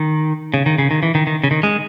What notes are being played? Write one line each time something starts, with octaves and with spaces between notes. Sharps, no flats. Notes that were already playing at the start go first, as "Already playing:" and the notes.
Already playing: D#3
C#3
D#3
C#3
D#3
E3
D#3
D#3
C#3
D#3
G#3